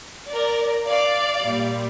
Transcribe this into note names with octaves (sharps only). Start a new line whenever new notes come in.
A#4 D5
D5 F5
A#2 G3